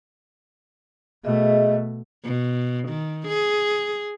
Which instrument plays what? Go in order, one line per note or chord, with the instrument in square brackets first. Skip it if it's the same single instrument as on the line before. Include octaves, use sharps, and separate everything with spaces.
[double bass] B2 A3 [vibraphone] G#4 D#5 E5
[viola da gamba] B2
D#3
G#4